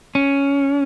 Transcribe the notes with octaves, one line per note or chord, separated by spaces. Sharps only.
C#4